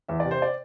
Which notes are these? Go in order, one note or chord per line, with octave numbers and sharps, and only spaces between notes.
E2 E5
C3 D5
C5
D5